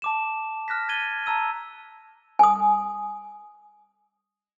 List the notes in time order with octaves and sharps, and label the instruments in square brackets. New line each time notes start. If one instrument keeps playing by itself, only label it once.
[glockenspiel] A5 D6 E7
F6 F#6 A#6 B6
G#6 A6 D#7 G7
A5 A#5 E6 D#7
[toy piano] G#5 D#6